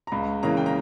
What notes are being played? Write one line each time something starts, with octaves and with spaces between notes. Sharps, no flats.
A#5
C#2 B5
C#3 E3 A#3 A#5
G5
A#5